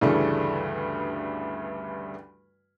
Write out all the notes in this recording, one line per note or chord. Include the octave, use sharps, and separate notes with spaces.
D2 G2 C#3 E3 G3 A3